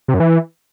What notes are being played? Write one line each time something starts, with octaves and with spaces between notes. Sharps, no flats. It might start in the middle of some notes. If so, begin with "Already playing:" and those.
C3
F#2
E3